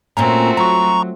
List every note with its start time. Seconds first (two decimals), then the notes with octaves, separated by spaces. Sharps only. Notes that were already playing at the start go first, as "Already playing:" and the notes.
0.17 A#2 A3 A#3 C4 C#4 F#4 A#5
0.57 F#3 A#5 C#6